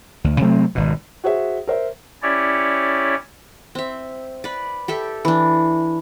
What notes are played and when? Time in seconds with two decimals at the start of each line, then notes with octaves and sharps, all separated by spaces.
0.24 D2
0.41 C3 F#3 A3 C4
0.75 G#1 B2
1.24 F#4 G#4 C5 E5
1.67 A#4 C5 E5
2.22 C#4 E4 G4 C#5 D5
3.75 C4 E5
4.44 B4 D5
4.88 G4 A4 E5
5.25 E3 D4